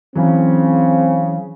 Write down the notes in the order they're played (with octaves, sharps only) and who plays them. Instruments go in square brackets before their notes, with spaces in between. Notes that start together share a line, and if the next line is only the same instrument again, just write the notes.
[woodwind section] C#3 C#4 [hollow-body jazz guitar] E3 F#3 [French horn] C4